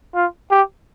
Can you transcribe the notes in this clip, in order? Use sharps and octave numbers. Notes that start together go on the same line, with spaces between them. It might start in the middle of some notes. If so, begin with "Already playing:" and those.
F4
G4